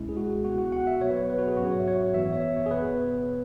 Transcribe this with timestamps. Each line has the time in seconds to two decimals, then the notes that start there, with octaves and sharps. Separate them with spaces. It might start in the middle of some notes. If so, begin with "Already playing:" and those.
Already playing: C#2 B2 G#3 C#4 E4
0.09 G#4
0.17 F#4
0.44 B2 B3 F#4
0.58 F#4
0.72 F#5
0.87 E5
1.01 B2 F#3 B3 C#5
1.10 B4
1.17 C#5
1.30 B4
1.38 F#4
1.48 G#4
1.57 G#2 F#3 C#4 F#4
1.72 C#5
1.80 E5
1.87 C#5
2.14 F#2 E3 B3 E5
2.33 C#5
2.41 E5
2.57 C#5
2.66 G#4
2.71 B2 B3 B4